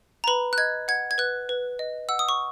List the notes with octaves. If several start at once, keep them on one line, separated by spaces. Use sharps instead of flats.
A#5
B4 B5
F#6
D#5 G#6
F#5 G#6
G#6
B4 F#6
B4
D#5
F#5 E6
D#6
C#6